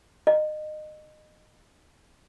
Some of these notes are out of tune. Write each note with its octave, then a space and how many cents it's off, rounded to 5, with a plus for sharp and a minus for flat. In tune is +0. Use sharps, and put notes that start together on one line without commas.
D#5 -25